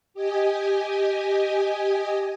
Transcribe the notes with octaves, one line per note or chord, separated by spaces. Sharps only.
G4 D#5 G#5